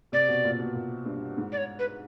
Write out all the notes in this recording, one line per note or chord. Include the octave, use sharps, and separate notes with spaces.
C3 D5
B2
A#2
B2
A#2
G2
G#2
D5
C#5
B4